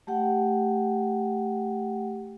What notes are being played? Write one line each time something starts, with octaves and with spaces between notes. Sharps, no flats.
A3 G4 F#5 G5